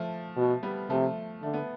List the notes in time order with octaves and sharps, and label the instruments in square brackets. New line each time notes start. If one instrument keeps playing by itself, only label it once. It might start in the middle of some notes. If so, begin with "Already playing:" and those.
Already playing: [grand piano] F3 A3
[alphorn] B2
[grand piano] G3 B3
[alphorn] C3 [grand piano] F3 A3
[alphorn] D3 [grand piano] A3
[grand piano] B3